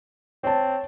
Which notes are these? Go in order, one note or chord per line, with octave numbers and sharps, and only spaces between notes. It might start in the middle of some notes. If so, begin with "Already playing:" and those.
C4 C#5 A5